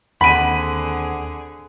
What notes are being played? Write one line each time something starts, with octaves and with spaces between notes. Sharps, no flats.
D#2 D3 C4 G#4 C5 F#5 B5 D#7